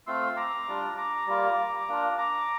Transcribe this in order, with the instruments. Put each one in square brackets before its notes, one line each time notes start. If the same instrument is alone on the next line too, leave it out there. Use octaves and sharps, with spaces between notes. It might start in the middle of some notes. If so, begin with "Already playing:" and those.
[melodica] A3 C4 F4 C6 E6
A#5 D6
G3 D4 F4
A#5 D6
G3 A#3 F4
A#3 D4 F4
A#5 D6